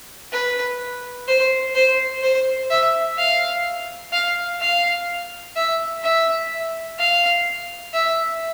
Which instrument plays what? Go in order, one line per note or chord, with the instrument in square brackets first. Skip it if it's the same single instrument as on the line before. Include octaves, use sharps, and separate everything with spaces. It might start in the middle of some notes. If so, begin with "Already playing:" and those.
[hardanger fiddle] B4
C5
C5
C5
E5
F5
F5
F5
E5
E5
F5
E5